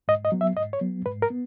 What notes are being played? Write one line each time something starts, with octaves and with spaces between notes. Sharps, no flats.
G#2 D#5
D#5
F#3 B3
E5
G#2 D#5
C#5
F#3 B3
G#2 B4
A#4
B3